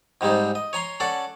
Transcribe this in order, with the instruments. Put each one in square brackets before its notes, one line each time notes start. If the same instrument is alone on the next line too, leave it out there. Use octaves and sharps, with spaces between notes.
[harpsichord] G#2 G3 G#3 C4 D#4
D#5
C#5 G#5 A#5 C6
C#4 A4 D5 F#5